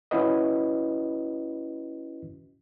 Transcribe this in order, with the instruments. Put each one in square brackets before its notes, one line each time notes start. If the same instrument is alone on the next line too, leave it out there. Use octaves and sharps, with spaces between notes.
[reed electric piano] C#4 E4 F#4 B4 D#5